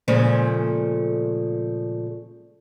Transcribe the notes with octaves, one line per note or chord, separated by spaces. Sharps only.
A#2 C#3 F3 G#3 A3